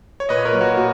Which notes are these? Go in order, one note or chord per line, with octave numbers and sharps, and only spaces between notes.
C#5
A#2 B4 D#5
A#4 C#5
F#3 A#3
F#4 A#4
A#2 F#4